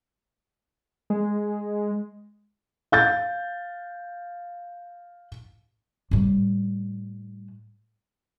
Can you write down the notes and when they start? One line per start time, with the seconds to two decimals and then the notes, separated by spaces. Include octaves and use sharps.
1.10 G#3
2.92 F5 G6 A6
6.11 A2 G3